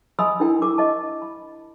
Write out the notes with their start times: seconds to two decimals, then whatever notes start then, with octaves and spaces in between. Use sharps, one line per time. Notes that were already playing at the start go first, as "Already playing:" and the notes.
0.19 D#5 G#5 B5 C6 D#6 E6
0.40 D4 E4 A#4 G5
0.62 A#4 C#6 D6
0.78 D#5 A5
1.22 B5